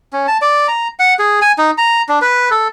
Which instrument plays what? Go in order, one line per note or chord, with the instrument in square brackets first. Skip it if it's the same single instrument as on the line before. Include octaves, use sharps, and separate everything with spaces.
[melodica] C#4
A5
D5
A#5
F#5
G#4
G#5
D#4
A#5
D4
B4
A4